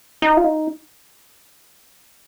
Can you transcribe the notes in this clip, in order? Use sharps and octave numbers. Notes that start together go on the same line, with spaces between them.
D#4
F4
D#4